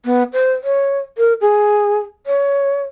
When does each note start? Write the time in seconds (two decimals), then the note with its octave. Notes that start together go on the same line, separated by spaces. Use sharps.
0.06 B3
0.33 C5
0.63 C#5
1.18 A#4
1.41 G#4
2.27 C#5